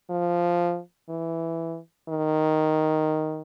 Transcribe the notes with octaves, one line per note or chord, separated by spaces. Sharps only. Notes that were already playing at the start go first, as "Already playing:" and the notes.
F3
E3
D#3